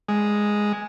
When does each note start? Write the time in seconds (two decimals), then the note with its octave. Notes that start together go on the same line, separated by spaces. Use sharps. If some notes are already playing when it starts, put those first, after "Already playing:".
0.08 G#3